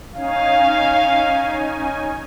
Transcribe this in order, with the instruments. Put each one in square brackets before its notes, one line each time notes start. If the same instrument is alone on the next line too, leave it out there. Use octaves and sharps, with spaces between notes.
[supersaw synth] C#4 D#4 G#5 [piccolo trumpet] F5